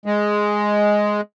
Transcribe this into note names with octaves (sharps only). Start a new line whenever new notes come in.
G#3